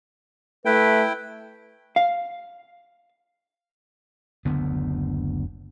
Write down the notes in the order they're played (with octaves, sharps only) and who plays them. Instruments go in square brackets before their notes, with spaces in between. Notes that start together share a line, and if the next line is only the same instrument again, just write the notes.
[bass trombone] A3 [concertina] E4 G5 [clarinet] B4
[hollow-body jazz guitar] F5
[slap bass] F#1 D2 D3 B3